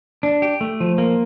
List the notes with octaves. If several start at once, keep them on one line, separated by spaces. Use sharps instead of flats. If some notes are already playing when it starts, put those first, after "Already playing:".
D4
G4
A3
F3
A#3